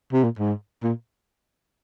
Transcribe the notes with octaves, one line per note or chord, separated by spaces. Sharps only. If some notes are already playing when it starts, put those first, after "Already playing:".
C3
A#2
G#2
A#2